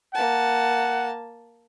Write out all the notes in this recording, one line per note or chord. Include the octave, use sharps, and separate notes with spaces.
A#3 F#5 A5